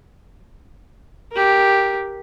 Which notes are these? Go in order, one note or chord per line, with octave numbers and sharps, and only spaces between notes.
G4 A#4